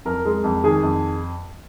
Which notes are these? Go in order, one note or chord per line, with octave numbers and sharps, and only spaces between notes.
F2 A#4
G#3
F2
D#3 G#4
F2